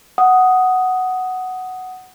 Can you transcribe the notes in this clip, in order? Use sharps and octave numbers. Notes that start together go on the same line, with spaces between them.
F#5 D#6